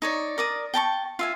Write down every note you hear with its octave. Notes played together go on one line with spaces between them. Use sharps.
D#4 C#5 D5
A#4 D5 D#6
G5 A5 A#5 C#6
F4 E5 G#5